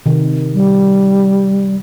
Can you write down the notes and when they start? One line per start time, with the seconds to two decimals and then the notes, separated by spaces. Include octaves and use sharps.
0.06 C3 D#3
0.54 G3